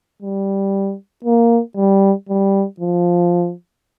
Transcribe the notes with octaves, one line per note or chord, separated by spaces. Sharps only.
G3
A#3
G3
G3
F3